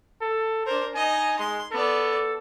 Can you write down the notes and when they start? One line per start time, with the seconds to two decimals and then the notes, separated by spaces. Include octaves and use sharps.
0.21 A4
0.66 D4 A#4 C5
0.95 D#4 D#5 G#5
1.39 G#3 C6
1.72 B3 A4 D5